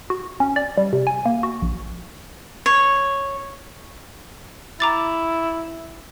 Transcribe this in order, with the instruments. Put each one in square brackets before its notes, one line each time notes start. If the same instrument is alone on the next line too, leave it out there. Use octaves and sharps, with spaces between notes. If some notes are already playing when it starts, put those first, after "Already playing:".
[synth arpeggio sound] F#4
C#4
D5
G3
C3
G#5
A#3
F#4
A#1
[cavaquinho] C#5
[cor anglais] E4 [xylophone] A#5 D6 A6